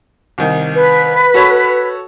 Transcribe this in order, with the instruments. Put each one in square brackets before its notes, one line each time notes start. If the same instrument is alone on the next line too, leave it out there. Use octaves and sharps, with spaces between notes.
[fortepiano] C2 D#3
[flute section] B4
[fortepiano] F#4 A4 C#5